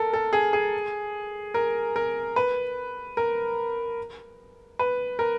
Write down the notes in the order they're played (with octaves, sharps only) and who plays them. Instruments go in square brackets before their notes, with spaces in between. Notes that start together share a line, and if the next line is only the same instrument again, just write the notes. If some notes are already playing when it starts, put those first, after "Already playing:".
Already playing: [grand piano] A4 A#4
A4
G#4
G#4
A#4
A#4
B4
A#4
B4
A#4